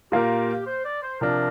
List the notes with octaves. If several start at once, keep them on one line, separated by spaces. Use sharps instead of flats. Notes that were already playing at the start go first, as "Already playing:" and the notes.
A#2 A#3 F4 G4 A#4
C5
D5
C5
C3 F3 D4 A#4